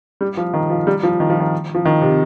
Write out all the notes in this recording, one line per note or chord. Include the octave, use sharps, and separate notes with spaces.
G3
F3
D#3
F3
G3
F3
D#3
F3
D#3
F3
D#3
C3